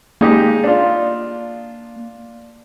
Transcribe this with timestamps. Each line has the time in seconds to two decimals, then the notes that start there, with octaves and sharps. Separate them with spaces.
0.21 G#3 A#3 D#4 G4
0.64 D4 F4